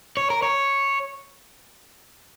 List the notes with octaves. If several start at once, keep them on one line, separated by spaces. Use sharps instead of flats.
C#5
A#4
C#5